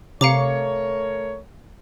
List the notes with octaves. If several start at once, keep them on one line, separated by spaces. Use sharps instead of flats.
C3 A3 A#4 C#5 F5 A#5 D6 C#7